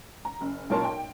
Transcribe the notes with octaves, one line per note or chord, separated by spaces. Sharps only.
A#5
F#1
B1 A#2 A#4 C#5 A5 C6
G5